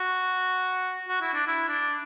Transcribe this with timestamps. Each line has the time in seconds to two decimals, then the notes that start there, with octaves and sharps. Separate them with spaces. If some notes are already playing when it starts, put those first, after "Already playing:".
Already playing: F#4
1.09 F#4
1.21 E4
1.34 D4
1.47 E4
1.68 D4